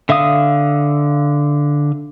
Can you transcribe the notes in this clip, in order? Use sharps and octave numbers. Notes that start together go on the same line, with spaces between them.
D3 E5 F5 D#6